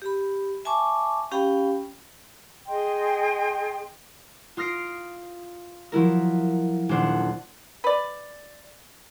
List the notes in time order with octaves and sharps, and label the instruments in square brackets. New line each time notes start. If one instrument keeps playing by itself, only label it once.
[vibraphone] G4 B5
E5 G#5 A5 C#6 D6
C#4 G4 F5 G5 B5
[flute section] G#4 D#5 G5 C6
[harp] F4 D#6 F6 A#6 C7 D7
F3 F#3 E4 A#4
D#1 D4 C5 F#5
[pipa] B4 D5